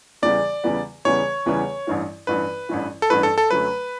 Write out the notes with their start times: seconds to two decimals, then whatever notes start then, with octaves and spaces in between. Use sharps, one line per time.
0.22 E2 C#3 E3 G3 B3 D5
0.64 E2 C#3 E3 G3 B3
1.05 E2 C#3 E3 G3 B3 C#5
1.46 E2 C#3 E3 G3 B3
1.87 A1 G2 E3
2.27 A1 G2 E3 B4
2.69 A1 G2 E3
3.02 A4
3.10 A1 G2 E3 B4
3.23 A4
3.38 A4
3.51 F#2 D3 F#3 A3 B4